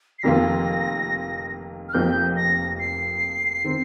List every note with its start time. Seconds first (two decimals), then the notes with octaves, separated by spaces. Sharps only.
0.19 C7
0.23 F1 F2 D#3 A#3 F4 A#6
1.89 F6
1.94 F1 F2 F3 A#3 D#4 G6
2.37 A#6
2.79 C7
3.64 D#3 C4